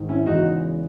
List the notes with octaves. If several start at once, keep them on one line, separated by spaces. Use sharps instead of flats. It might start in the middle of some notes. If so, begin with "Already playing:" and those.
Already playing: G#2 D#3
C#4 E4
E2 C#3 G#3 D#4 F#4